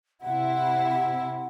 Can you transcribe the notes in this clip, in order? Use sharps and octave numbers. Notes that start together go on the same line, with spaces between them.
C3 E4 F#5